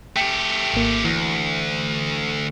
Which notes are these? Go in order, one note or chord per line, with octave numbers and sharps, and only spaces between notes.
A3 G4 G5
G#1 A#3
D2 E3